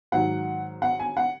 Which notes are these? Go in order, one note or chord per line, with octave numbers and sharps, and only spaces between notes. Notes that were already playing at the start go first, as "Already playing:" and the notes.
G#2 D#3 F#3 F#5
F#5
G#5
F#5